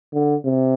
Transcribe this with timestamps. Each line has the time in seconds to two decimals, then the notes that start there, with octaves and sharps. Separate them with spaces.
0.13 D3
0.45 C3